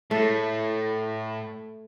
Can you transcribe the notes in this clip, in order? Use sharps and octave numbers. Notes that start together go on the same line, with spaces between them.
A2 A3